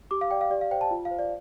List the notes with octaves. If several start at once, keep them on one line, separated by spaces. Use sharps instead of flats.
G4 D6
F5
D5 G5
F5
G4 D5
F5
C5 G5
A5
F4
F5
C5
D5